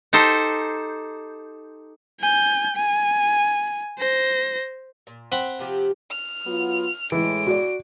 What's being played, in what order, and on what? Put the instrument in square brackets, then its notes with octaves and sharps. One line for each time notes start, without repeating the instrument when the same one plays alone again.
[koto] D#4 G4 A4 C5
[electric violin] G#5 G6
G#5
C5 A#6
[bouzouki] A#2
[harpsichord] C4 F#5 B5
[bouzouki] C3 F3 G4
[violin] F6
[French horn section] F#3 B3 F4
[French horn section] A2 G#3 [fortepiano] E3 [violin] D7
[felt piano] F#4 D5